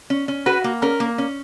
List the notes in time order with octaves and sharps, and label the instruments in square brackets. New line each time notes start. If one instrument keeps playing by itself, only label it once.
[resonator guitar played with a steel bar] C#4
C#4
[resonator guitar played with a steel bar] F#4 [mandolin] B4
[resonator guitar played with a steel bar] A#3
[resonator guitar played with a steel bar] C#4 [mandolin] A#4
[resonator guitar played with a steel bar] A#3
C#4